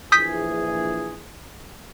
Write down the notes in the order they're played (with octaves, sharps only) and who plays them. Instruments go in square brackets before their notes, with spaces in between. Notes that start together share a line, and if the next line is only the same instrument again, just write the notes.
[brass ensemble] A#1 E3 G#4 [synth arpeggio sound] D#6 G6 B6